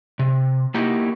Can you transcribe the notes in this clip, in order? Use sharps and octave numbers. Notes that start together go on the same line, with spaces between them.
C3
A#3 D#4 E4 F#4 G4